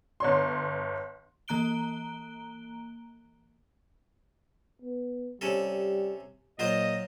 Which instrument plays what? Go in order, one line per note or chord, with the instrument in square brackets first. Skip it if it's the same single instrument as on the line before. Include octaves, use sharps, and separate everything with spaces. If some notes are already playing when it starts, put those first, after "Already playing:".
[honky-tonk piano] G1 C#5 C6
[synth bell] E3 A#3 A#5 F#6 D7 G7
[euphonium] B3
[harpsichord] C3 C#4 A4 [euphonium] G3
[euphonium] A#2 [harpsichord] F#3 F4 C5 [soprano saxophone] D#5